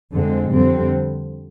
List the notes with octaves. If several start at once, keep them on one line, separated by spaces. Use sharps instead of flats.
F2 D3 G#3 C4
F2 D3 G3 C4